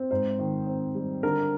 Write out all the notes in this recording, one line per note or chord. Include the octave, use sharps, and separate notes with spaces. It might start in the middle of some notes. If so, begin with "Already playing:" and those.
Already playing: C4
G#2 C5
D#3
C4
G3
D3 A#4